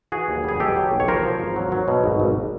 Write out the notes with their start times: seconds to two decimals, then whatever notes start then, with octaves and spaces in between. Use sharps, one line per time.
0.12 E3 F#4 G#4
0.28 D#2
0.44 G3 G#4
0.60 B2 G4 A4
0.76 F#3
0.92 B1
1.00 C#5
1.08 F3 A#4 C5
1.23 F3
1.40 G#1
1.56 F#3
1.72 F#3
1.88 B2
2.04 G#1
2.20 G#1